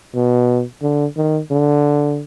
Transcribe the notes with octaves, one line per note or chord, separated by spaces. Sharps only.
B2
D3
D#3
D3